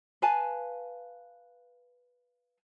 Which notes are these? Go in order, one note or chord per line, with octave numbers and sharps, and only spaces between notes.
B4 F5 G#5 A5